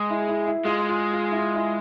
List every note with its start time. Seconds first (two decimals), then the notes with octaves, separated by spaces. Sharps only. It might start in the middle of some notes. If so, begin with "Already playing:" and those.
Already playing: G#3 G#4
0.10 E4
0.28 E4
0.47 E4
0.65 G#3 F4
0.89 F4
1.13 F4
1.31 E4
1.37 F4
1.55 E4